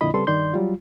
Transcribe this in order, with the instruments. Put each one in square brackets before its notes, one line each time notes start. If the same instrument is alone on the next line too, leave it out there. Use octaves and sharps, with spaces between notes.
[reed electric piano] F2 A#2 D3 E4 D#5 B5
C#3 G3 C4 A4 B4 C6
G2 D#3 D5 C6 G6
F#3 G3 F4